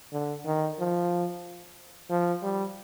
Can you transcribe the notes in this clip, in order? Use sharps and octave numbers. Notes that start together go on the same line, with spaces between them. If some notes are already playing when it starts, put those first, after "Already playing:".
D3
D#3
F3
F3
G3